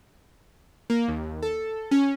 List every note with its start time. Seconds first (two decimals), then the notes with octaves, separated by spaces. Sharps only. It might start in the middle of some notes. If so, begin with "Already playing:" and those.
0.90 A#3
1.08 D#2
1.42 A4
1.91 C#4